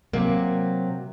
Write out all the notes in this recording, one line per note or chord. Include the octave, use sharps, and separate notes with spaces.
C3 F#3 A#3